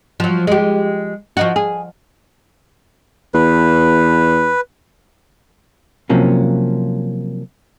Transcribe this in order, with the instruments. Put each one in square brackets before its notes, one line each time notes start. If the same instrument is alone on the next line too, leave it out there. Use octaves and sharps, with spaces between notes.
[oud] F3 F#3
G#3 G4
F3 D#4 F#4
G#4
[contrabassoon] E2 [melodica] B4
[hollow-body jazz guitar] C3 F3 F#3 A#3 C#4